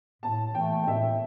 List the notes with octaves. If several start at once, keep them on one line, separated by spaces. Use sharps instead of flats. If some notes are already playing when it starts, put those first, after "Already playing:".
A2 A5
E3 A3 G5
G5
A2 E5